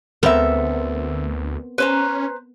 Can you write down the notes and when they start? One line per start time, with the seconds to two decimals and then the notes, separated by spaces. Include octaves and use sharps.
0.23 D2 B3 C4 A4 A#4 E5
1.78 C#4 B4 C5 A#5